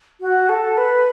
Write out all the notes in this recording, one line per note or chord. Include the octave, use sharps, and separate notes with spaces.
F#4
A4
B4